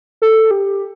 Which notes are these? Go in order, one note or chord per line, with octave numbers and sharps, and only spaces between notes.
A4
G4